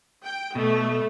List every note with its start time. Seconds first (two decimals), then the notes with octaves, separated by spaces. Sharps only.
0.24 G5
0.55 B2 A3